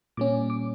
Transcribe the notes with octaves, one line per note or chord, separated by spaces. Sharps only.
A#2 G3 C#4 D6
D6